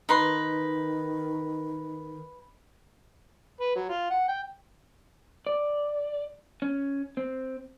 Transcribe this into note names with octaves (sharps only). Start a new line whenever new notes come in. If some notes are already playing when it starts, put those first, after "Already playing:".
D#3 D#4 B4 C6
B4
F#3
F4
F#5
G5
D5
C#4
C4